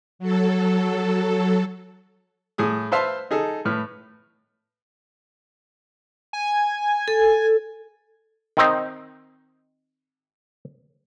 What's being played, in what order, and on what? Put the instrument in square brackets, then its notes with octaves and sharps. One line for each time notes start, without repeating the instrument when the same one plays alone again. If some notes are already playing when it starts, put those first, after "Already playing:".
[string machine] F#3 A4
[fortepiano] A2 G#4 D#6
B4 C5 E5 F5 A5 C6
D#4 G#4 A4
A2 B4 F6
[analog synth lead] G#5
[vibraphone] A4
[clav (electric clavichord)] D#3 C4 D#4